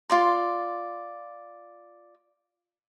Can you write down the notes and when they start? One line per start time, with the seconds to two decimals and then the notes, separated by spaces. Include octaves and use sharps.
0.10 F4 D5 C6